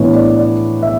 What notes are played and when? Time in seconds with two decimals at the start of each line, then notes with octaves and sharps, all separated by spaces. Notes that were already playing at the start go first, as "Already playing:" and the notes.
Already playing: A2 E3 B3 D4 B4 C#5
0.15 D5
0.38 D5
0.82 E5